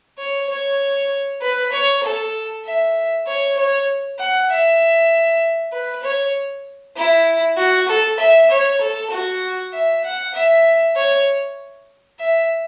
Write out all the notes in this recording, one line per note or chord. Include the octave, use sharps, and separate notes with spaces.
C#5
C#5
B4
C#5
A4
E5
C#5
C#5
F#5
E5
B4
C#5
E4
F#4
A4
E5
C#5
A4
F#4
E5
F#5
E5
C#5
E5